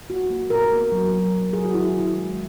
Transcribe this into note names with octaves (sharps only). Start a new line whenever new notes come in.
A#3 F#4
A#3
B2 A#4
A#3
F#3
F#3
B2
F#3 G#4
F#4
D#3 E4
D#3
G#3